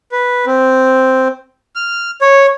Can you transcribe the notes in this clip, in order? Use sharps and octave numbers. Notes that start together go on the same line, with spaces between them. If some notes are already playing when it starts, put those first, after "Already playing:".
B4
C4
F6
C#5